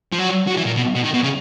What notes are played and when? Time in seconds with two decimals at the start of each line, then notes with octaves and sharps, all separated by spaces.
0.13 F3
0.19 F#3
0.48 F#3
0.57 E3
0.66 A#2
0.76 B2
0.95 B2
1.04 D#3
1.14 B2
1.23 C#3